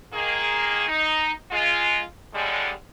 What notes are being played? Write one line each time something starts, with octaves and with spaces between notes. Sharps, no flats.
D#3 A#3 G#4
D#4
G#3 F4
A2 D3 G3 G#3